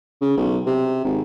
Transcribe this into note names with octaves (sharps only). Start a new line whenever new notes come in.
C#3
B1
C3
G#1